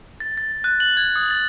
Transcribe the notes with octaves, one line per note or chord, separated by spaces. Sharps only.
A6
A6
F#6
F#7
G#6
D#6
A6